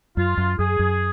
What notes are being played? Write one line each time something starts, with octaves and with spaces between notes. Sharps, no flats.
F#2 F4
F#2
F#2 G#4
F#2